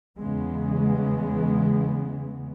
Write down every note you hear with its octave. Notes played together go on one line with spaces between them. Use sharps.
E2 C#3 E3 G#3 B3